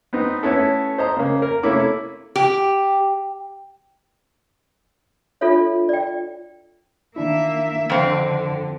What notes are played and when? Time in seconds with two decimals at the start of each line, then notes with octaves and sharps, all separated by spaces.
0.13 B3 C4 D#4
0.43 A3 B3 C#4 E4 A4
0.98 C5 D#5 A#5
1.17 C#3 A#3
1.42 A#4
1.63 C3 A3 A#3 C#4 E4 D6
2.36 G4
5.41 D4 F4 A4 C#5 E5
5.89 D5 G5
7.16 D#3 A#3 D4 E4 E5
7.90 F2 D3 C4